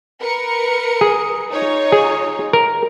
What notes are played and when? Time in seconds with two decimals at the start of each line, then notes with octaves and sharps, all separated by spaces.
0.20 A#4 B4 C#7
1.01 G#4
1.51 D#4 F4 C#5
1.92 G#4
2.53 A#4